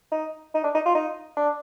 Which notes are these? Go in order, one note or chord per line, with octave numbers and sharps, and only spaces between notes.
D#4
D#4
D4
D#4
F4
D#4
D4